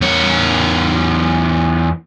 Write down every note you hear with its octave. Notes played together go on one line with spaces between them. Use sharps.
E2 C#5